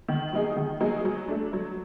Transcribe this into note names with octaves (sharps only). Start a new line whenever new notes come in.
D#3
F#3 A#3 D#4 G#4
D#3
F#3 A#3 D#4 G#4
F#3
A3 D4
F#3